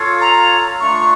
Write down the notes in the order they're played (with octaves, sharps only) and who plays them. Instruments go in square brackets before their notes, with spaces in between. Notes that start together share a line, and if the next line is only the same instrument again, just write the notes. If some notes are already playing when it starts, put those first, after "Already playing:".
Already playing: [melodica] F4 A4 C#5 F5
[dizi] A#5
[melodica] A3 D4 F4 [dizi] C#6